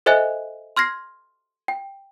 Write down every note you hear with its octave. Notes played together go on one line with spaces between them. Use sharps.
A4 C5 D#5 E5 G#5 F#6
C6 F6 G#6 A#6 C7
G5